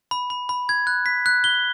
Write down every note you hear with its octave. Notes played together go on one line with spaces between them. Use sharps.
B5
B5
B5
G#6
F#6
B6
F#6
G7